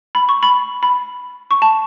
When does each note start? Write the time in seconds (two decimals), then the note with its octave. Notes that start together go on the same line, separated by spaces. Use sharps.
0.15 B5
0.29 C#6
0.43 B5
0.83 B5
1.51 C#6
1.62 A5